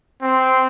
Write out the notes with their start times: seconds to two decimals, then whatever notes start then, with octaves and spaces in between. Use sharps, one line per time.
0.22 C4